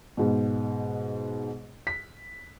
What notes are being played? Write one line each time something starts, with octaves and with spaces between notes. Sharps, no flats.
G#2 B2
B6